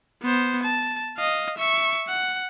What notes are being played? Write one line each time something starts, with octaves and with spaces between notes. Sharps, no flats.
B3 C5
A5
D#5 F5
E5 C#6
F#5